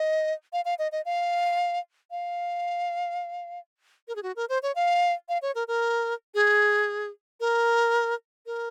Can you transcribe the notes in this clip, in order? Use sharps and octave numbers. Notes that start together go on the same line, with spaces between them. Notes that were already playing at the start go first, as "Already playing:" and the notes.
Already playing: D#5
F5
F5
D#5
D#5
F5
F5
A#4
G#4
F#4
A#4
C5
C#5
F5
F5
C#5
A#4
A#4
G#4
A#4
A#4